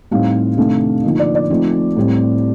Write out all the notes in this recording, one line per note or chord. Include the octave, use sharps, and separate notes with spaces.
A2 G3 C4 D#4 F5
C3 D#3 A3 D4
D3 F3 A#3 D#4
D5
D5
F3 A3 C4 D#4
A2 G3 C4